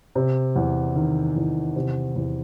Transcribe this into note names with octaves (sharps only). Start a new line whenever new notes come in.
C3
E2
D#3
E2
C3
E2